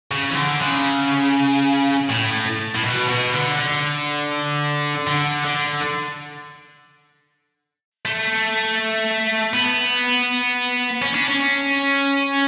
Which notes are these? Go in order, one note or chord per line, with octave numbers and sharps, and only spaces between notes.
C#3
E3
D3
C#3
A2
A2
B2
B2
D3
D3
D3
D3
A3
B3
C#4
D4
C#4